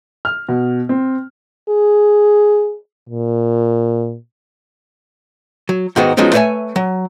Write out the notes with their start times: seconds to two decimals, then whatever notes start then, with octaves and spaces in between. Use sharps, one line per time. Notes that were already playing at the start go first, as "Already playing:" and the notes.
0.25 F6
0.49 B2
0.89 C4
1.69 G#4
3.09 A#2
5.69 F#3
5.96 G#2 D#3 G#3 B3 F#4
6.17 F3 F#3 G#3 B3 C#4 D#4
6.32 A3 B4 C#5 D5 E5 G#5
6.76 F#3